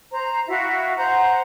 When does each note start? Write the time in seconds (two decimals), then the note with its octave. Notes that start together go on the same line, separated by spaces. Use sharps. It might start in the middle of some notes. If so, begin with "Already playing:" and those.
0.12 C5 A#5
0.48 E4 F#4 E5 F5
0.96 C5 F#5 A#5